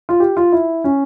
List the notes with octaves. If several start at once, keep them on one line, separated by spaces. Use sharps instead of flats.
F4
G4
F4
E4
C#4